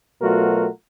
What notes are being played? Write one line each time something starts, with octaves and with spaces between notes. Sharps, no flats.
B2 F#3 A3 F4 F#4 A#4